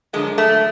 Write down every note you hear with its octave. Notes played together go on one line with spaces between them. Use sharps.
F#2 D3 F3 G#3
A3